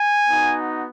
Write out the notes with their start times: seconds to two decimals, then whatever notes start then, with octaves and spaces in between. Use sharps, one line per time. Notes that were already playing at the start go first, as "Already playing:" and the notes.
Already playing: G#5
0.29 B3 D#4 F#4